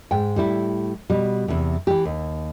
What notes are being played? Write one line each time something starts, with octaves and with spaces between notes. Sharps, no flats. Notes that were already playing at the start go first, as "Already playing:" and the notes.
G#2 G5
A2 G3 E4
B2 G3
E2 C3
E3 G4
D#2